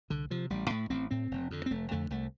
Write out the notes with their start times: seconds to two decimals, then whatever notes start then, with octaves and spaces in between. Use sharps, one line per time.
0.10 C2 D3
0.31 C3 F3
0.50 A1 G3
0.70 A2 A3
0.90 A1 C4
1.11 A2 C4
1.31 F1
1.51 F2 D3
1.66 C4
1.71 F1 A3
1.91 F2 D3 A3
2.10 C2 A3